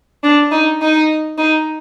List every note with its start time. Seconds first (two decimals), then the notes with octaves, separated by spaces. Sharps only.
0.24 D4
0.52 D#4
0.82 D#4
1.38 D#4